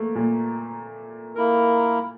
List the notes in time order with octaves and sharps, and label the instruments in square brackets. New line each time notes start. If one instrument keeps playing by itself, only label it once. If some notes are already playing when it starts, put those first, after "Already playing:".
Already playing: [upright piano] A3 A#3
A#2
[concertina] A#3 E4 A#4